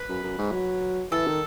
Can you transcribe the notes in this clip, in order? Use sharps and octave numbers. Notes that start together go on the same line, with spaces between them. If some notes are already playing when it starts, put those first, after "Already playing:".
Already playing: B4
F#2
F#2
G#2
F#3
E3 A4
D#3